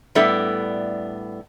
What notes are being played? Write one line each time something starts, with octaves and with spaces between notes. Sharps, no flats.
A2 G3 B3 D4 A4 E5